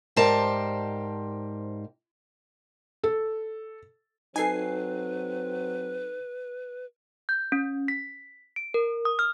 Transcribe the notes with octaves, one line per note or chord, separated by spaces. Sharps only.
G#2 G4 A#4 C5 D5 A5
A4
F#3 C4 D#4 A4 B4 G#5 C7
G6
C#4
B6
D7
A#4
D#6
F6